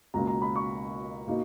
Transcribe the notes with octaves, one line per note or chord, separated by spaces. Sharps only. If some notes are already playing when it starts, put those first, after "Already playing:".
C#2 B2 A#3 C#4 A#5
A#5
B5
C#6
B2 A#3 D#4